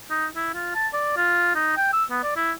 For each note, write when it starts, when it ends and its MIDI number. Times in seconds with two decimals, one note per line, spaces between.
0.10 0.26 63
0.36 0.54 64
0.54 0.71 65
0.75 0.88 81
0.93 1.16 74
1.17 1.53 65
1.55 1.73 63
1.77 1.90 79
1.93 2.04 88
2.11 2.19 59
2.23 2.36 74
2.36 2.52 64